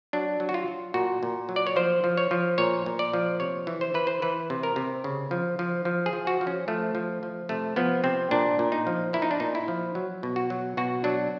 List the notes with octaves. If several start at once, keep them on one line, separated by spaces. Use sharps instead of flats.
F#3 D4
F#3
F#4
F4
F#3
A#2 F#4
A#2
F#3
D5
C#5
F3 C5
F3
C#5
F3
A#2 C#5
A#2
D5
F3
C3 C#5
E3
C5
E3 B4
C5
E3 B4
C3
A#4
C3
C#3
F3
F3
F3
G#4
F3
F#4
F3
C#4
F3 A3
F3
F3
C3 A3
F3 B3
C3 C4
A#2 D4
A#2
D#4
F3
A#2 E4
D#4
D4
A#2 D#4
E4
F3
F#3
B2
F#4
F#3
B2 F#4
F#3 D4